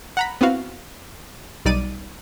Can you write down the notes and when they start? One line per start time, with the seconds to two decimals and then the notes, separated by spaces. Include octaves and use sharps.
0.17 F#5 A#5 B5
0.41 B3 C4 E4 F#4 F5
1.65 B1 G3 D#4 D5 D6 D#7